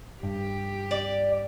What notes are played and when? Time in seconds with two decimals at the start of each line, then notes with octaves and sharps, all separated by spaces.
0.23 G2 G4
0.91 D5